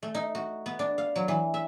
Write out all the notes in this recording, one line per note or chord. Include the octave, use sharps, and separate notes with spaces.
A3
D#4
F#4
B3
D4
F5
F#3
E3
E5